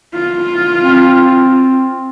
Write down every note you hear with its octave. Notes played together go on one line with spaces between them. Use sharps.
F4
C4